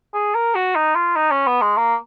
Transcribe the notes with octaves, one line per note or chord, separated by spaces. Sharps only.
G#4
A#4
F#4
D#4
F4
D#4
C#4
B3
G#3
A#3